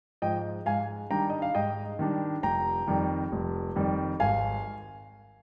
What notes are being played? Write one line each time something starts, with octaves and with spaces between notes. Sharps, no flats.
G#2 F3 D#5 G5
G#2 F5 G#5
D#3 G3 D4 G5 A#5
D#5
F5
G#2 D#5 G5
D#3 G3 D4
F1 G5 A#5
F2 D#3 G3
F1
F2 D#3 G3
G#1 F5 G#5